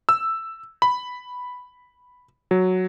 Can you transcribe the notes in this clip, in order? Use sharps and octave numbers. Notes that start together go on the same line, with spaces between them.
E6
B5
F#3